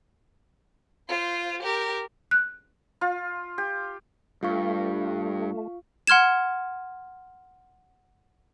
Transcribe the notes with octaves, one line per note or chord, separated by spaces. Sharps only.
F4 C5
G4 A#4
F#6
F4
G4
G2 A3 F4 F5 C#6
F#5 C6 F6 G#6 E7